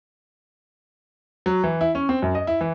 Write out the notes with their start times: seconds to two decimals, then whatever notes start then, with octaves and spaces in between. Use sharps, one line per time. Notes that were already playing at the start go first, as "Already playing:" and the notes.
1.46 F#3
1.64 E3
1.81 E4
1.95 C#4
2.09 C4
2.22 F#2
2.35 D#5
2.47 E4
2.61 E3